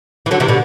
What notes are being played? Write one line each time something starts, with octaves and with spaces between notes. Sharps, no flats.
E3
D3 F#3
C3 E3
B2 D3